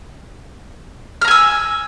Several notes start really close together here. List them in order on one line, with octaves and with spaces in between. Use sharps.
F6 A#5 G#5 E6